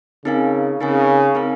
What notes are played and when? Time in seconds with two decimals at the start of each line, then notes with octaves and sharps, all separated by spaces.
0.25 C#3 C4 D#4 A#4 F5 G#5
0.80 C#3 C4 D#4 A#4 F5 G#5
1.35 C4 D#4 A#4 F5 G#5